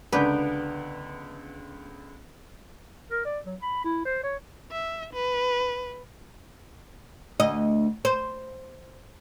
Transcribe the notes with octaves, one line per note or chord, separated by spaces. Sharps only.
C#2 D3 B3 D4 B4 G5
A#4
D5
F#3
B5
E4
C5
C#5
E5
B4
D2 D#5
C5